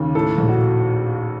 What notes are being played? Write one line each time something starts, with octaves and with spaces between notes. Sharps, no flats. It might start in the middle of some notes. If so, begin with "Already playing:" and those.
Already playing: D#2 C#3
A2 A4
A#1
F#4